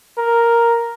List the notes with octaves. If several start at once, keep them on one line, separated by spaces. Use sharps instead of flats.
A#4